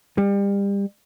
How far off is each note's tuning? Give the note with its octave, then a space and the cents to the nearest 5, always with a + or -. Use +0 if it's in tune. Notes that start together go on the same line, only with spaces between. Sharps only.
G3 +30